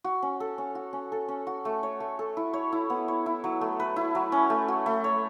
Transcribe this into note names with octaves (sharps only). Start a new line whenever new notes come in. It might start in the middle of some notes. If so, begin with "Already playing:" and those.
F#4
C#4
A4
C#4
F#4
C#4
A4
C#4
F#4
A3
C#5
A3
A4
E4
C#5
E4
B3
C#5
E4
F#3
A3
B4
E4
F#3
C#4
A3
F#4
A3
C#5